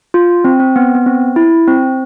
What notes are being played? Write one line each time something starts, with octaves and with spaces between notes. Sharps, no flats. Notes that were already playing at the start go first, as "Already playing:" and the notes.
F4
C4
C4
B3
B3
C4
E4
C4